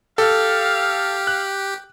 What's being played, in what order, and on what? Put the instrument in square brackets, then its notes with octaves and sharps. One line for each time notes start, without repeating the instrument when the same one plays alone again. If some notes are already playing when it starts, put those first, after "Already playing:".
[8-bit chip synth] G4 [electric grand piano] A4 [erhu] F5
[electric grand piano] F#6